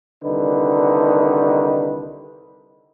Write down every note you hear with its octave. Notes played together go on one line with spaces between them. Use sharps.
C2 D3 D#3 D#4 B4